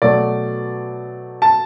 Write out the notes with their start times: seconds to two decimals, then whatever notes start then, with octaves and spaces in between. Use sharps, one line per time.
0.02 B2 F#3 A3 D5
1.42 A5